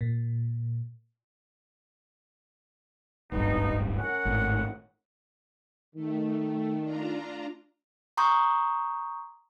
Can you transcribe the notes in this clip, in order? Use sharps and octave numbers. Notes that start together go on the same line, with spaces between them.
A#2
D1 G#1 G2 B3 D4 D#4
C#4 A#4 F#5
G#1 A2
D#3 A3
D4 F4 A#5
A#5 C6 C#6 D#6 G6